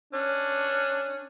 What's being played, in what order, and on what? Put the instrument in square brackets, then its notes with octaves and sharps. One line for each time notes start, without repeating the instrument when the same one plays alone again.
[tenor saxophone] C#4 [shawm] D4